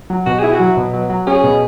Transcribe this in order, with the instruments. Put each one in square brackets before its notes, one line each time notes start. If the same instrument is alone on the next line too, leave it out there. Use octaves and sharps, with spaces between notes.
[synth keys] F#3
[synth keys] B2 [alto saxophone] F#4
[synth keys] E4 [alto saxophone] G#4
[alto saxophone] F#4
[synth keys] F#3
B2
F#3
F#3
[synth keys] C#4 [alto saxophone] G#4
[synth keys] B2